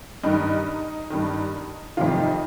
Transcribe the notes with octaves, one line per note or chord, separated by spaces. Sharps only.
G2 D#3 D#4
G2 D#3
F2 C3 D#3 F4
D#4